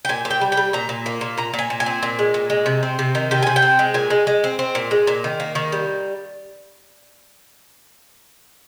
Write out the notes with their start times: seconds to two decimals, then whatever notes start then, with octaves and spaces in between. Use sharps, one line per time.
0.05 G5
0.09 A#2 G#5
0.25 A#2
0.31 G5
0.41 G3
0.52 G5
0.57 G3
0.73 A#2 A#5
0.89 A#2
1.06 A#3
1.21 A#2
1.38 A#2 A#5
1.54 A#2
1.59 G#5
1.70 A#2
1.80 G#5
1.86 C4
2.03 A#2
2.19 G#3
2.34 A#2
2.50 G#3
2.66 C3
2.83 C4
2.99 C3
3.15 D#3
3.31 C3 G5
3.42 C3 G#5
3.56 G5
3.62 C4
3.79 G#3
3.94 A#2 G#5
4.10 G#3
4.27 G#3
4.44 C4
4.59 C4
4.75 A#2
4.91 G#3
5.07 A#2
5.24 D#3
5.40 A#3
5.55 D#3
5.72 G3